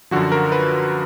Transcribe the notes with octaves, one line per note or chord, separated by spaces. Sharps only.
F#2 D3 F3 F#4
A#4
B4